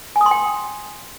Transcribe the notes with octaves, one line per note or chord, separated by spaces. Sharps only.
G#5
D#6
C6
G5